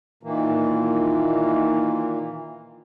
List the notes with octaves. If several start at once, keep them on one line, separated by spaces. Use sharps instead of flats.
A#2 D#3 E3 A#3